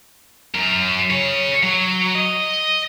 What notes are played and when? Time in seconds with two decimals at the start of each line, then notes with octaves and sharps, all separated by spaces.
0.55 F#2 A#4
1.11 G#4 C#5
1.63 F#3
2.15 D#5